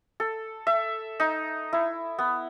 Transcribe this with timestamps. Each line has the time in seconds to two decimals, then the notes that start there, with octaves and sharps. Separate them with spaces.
0.20 A4
0.67 E5
1.20 D#4
1.73 E4
2.19 B3